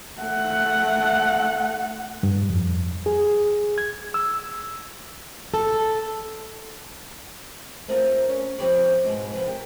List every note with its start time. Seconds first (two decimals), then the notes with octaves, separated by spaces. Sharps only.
0.20 A3 F#5
2.23 G2
2.50 F2
3.06 G#4
3.78 G#6
4.14 E6
5.54 A4
7.88 A3 C4 F4 A#4
8.28 C#4
8.58 F3 C4 G4 B4 C#5 D5
9.05 G#2 B2 G#3
9.33 C3 F3 B3
9.46 G4 A#4